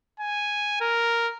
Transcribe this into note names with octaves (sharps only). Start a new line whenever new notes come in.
G#5
A#4